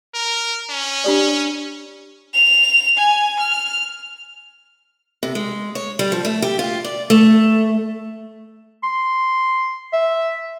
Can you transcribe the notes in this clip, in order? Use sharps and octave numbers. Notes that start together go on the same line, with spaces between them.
A#4
C#4
D4 G4 D5
F7
G#5
F6
C3
G#3
C#5
G3
F3
A3
G4
F4
D5
A3
C6
E5